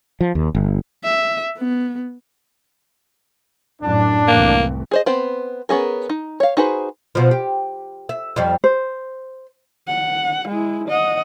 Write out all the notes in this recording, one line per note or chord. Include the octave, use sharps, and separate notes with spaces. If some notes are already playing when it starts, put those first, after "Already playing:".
F3
D#2
G1
E5
B3
F#2 A2 D4
C2 E3 A3 A#3
G#4 C5 D#5
B3 C4 C5
B3 C#4 G#4 A#4
D#4
C#5 F5
D#4 F#4 G#4 B4 C5
B2 F3
G4
E5
F2 F3 G3
C5
F#5
G#3 E4
D#5 F#5